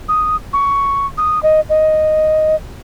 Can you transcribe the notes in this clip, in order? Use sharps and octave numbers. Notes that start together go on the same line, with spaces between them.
D#6
C#6
D#6
D#5
D#5